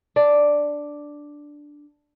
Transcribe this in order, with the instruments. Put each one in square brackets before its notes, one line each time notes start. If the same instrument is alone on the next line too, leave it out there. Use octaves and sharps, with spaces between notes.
[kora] D4 D5